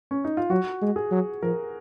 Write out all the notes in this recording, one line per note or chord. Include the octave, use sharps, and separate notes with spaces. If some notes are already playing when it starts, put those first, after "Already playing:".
C#4
D#4
F4
F#3 F#4
G#3
G#4
F#3
F3 A#4